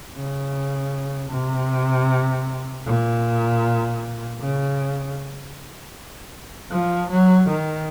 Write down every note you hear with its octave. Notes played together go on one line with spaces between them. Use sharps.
C#3
C3
A#2
C#3
F3
F#3
D#3